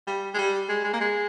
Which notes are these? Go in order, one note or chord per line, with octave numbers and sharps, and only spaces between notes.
G3
G#3
G3
G#3
G#3
A#3
G#3